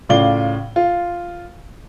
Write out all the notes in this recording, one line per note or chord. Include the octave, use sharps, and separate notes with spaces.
A2 C#3 F4 D5 G7
F4